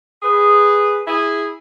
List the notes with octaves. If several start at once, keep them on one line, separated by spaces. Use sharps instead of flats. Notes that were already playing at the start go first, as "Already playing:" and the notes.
G#4 B4
E4 G#4